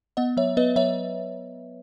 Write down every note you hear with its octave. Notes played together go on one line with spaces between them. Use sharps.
B3 D#5 F#5
F#3 C#5 E5
B3 B4 D#5
F#3 C#5 E5